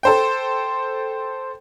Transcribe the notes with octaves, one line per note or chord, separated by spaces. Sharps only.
A4 C5 G5